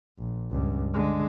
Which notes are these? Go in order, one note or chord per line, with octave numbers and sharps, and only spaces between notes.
A#1
C#2 G2
D3 G#3